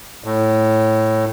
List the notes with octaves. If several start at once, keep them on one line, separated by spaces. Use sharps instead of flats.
A2